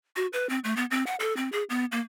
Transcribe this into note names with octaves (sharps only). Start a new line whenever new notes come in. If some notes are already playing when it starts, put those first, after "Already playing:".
F#4
B4
C4
A3
B3
C4
F#5
A4
C4
G#4
B3
A#3